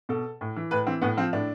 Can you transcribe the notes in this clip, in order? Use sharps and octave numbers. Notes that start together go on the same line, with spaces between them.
B2 A4
A2
E3
A2 B4
E3 C4
A2 B3
F3 C4
A2 D4